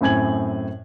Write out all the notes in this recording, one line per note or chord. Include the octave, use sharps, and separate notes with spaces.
F#2 A2 C4 G#5 G#6 F#7